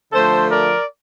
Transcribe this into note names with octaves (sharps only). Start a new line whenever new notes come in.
D3 F3 A3 A4 C5
A#4 D5